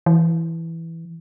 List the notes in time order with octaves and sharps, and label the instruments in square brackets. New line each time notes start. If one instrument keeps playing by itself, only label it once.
[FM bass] E3